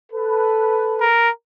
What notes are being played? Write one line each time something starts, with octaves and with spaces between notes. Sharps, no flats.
A4 B4
A#4